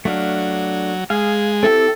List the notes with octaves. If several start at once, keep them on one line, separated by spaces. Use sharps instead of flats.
F#3 A3 D4 F5
G#3 G#4 F5
C4 E4 G4 A4